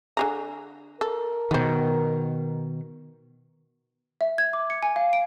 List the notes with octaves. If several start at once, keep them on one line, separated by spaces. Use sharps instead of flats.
D3 G#4 A#5
A4 A#4
B2 D#3 B3 C5
E5
G#6
D6
C#7
G#5
F5
D7